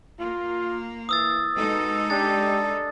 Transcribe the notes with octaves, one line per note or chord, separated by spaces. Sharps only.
A#3 F4
E3 D#6 E6 A6
B2 G#3 D#4 A4
D4 G4 A6